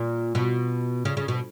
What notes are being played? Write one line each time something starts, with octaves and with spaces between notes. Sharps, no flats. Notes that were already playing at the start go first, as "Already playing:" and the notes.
Already playing: A#2
B2
C#3
C#3
B2